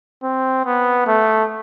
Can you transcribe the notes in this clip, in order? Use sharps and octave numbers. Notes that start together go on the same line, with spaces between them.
C4
B3
A3